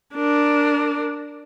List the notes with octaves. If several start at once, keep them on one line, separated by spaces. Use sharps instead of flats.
D4 A#4